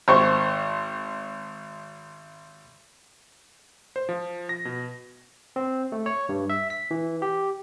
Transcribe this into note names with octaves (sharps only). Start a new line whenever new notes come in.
G#1 C5 C#6
C5
F3
A#6
B2
C4
A3
C#5
G2
E5
B6
E3
G4